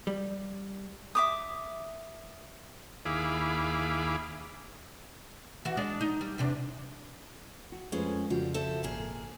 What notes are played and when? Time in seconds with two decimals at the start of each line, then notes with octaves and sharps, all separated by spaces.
0.07 G3
1.15 E5 D6 D#6
3.05 D#2 E4 G#4 F5 B5 D6
5.65 E3 F#4
5.77 G#3 D4 D5
6.01 D#4
6.21 G3
6.38 E2 C3 D4
7.72 F#4
7.92 F2 G#3 A3 C#4 F4 G#4 B4 C5
8.30 F2 G#2 C#3 F3 G3 F4 F#4
8.54 A4 C5 E5
8.83 G#1 A#2 A#3 G#4